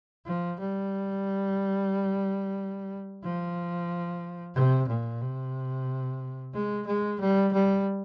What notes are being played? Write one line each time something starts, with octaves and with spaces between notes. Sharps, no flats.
F3
G3
F3
C3
A#2
C3
G#3
G#3
G3
G3